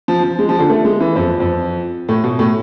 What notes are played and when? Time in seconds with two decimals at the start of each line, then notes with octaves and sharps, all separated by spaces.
0.08 F3
0.23 F3
0.39 G#3
0.49 F3
0.59 D3
0.70 A3
0.85 G#3
1.00 E3
1.16 F2
1.40 F2
2.09 A2
2.24 B2
2.39 A2